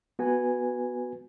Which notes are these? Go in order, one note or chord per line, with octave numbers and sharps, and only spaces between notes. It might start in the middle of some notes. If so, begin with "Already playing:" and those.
B3 F#4 B4 G#5